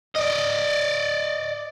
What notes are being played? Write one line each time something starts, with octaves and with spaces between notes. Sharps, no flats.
D5 D#5